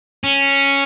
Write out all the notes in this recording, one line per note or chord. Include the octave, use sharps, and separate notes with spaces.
C#4